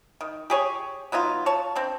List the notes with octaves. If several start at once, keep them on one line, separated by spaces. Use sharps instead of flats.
D#3
G4 G#4 C#5
F#3 B3 D#4 F4
C#5 A5
C4 D4